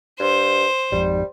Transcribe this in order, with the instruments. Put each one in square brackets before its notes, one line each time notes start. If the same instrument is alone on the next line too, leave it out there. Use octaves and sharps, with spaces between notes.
[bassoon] G2 [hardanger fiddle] C5
[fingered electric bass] G#1 F2 G#2 [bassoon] G3